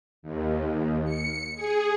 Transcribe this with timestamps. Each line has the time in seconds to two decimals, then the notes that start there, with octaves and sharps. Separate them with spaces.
0.23 D#2
1.05 C#7
1.56 G#4